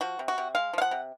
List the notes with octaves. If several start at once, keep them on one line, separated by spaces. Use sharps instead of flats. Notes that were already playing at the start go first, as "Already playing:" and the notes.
F3 F#4
C3
F#4
C3
G#3 F5
F3 F5
F#5
C3